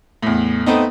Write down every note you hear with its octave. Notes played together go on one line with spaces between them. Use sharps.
E2 A2
A3 B3 C4 D#4